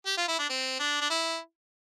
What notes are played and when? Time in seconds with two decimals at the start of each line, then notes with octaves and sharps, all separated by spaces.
0.06 G4
0.17 F4
0.28 E4
0.39 D4
0.50 C4
0.80 D4
1.01 D4
1.10 E4